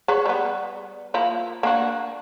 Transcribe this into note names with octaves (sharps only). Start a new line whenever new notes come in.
G#4 B4 C#5
G3 B3
F3 A#3 E4
A#3 D4 F#4